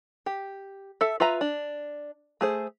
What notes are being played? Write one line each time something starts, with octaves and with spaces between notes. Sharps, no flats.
G4
A4 E5
F4 B4 E5 A#5
D4
A3 G#4 C5